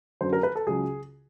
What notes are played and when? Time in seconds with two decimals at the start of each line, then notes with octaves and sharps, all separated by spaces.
0.21 F#2 D3 F#3 C5
0.33 A#4
0.43 B4
0.55 A4
0.66 C#2 C#3 F#3 G#4